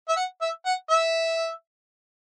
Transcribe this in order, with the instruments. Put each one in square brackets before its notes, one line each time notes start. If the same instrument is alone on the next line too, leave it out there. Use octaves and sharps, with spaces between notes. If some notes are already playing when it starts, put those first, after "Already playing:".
[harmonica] E5
F#5
E5
F#5
E5